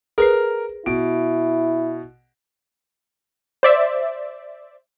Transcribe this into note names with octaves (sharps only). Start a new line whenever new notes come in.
G#4 A#4 B4 C7
B2 E4 D7
C5 D5 E5